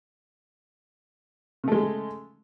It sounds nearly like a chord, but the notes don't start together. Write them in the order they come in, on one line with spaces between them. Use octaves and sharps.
C#3 A3 G#3